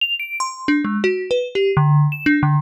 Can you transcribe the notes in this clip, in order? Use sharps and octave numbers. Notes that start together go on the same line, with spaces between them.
F7
D7
C6
D4
G#3
F#4
B4
G4
D3
E7
D4
D3